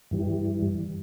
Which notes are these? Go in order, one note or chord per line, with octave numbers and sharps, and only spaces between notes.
G2 E3 G3